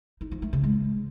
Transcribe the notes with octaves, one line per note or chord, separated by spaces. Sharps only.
D#4
F3
A3
C#3
G#3